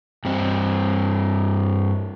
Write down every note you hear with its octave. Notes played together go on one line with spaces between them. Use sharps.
G2 C4